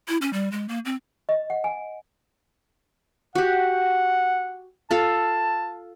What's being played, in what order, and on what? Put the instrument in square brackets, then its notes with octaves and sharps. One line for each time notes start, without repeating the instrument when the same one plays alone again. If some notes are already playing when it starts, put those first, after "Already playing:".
[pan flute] E4
C#4
G3
G#3
A#3
C4
[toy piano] D#5
F#5
G#5
[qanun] F#4 G4 [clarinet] F#5
[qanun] F4 A4 F5 [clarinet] A5